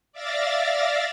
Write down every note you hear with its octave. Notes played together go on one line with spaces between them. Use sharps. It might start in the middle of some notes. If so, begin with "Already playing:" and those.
D5 E5 F5 A6 A#6